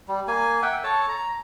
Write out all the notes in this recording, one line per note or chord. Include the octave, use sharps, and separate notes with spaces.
G3
A#3 G#5
E5 F#5 G5
A4 C#5 A5
A#5